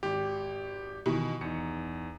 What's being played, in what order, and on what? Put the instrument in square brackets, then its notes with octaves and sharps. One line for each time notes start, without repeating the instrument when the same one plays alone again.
[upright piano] G#1 [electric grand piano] G4
[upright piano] B2 D#3 E3
[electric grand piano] E2 D#4 [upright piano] C#7